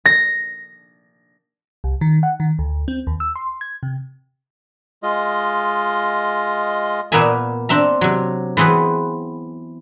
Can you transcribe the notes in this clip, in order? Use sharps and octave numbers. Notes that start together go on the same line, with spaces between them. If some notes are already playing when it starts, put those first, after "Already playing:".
A#6
C2
D#3
F#5
D#3
D2
C4
D#2
E6
C6
G#6
C3
G#3 F4 D#5
A#2 A#3 B3 A#4 E5 G#5
C4 D4 E5 A#5
C3 F#3
E3 B3 C4 G#4 B4